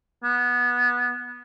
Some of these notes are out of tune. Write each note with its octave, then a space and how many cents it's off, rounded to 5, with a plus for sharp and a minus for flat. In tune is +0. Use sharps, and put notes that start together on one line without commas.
B3 -15